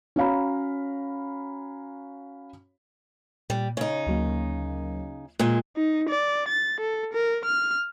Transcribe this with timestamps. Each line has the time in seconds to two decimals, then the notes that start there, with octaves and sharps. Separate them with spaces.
0.16 C#4 F#4 C#5 F5 A#5 B5
3.50 A#2 G3
3.77 C#3 D#4 C#5
4.07 D2 F#3 A#3
5.39 A#2 G#3 F#6
5.76 D#4
6.09 D5
6.48 A6
6.80 A4
7.13 A#4
7.45 F6